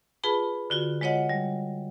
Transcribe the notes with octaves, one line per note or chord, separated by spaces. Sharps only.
F4 G#4 B4 A5 B5
D3 F4 F#4
G#3 F4 C#5 D#5 F#5
G3